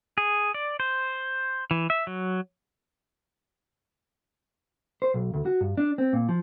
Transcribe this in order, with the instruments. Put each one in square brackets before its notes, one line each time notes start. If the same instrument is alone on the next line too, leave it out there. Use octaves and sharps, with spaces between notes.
[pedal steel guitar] G#4
D5
C5
E3
E5
F#3
[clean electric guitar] C5
B1
D2
F#4
G2
D4
C4
A#2
F3